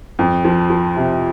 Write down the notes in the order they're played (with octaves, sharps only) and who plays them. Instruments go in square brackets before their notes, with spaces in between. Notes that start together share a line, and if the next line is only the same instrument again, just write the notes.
[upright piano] F2
F3
F3
C3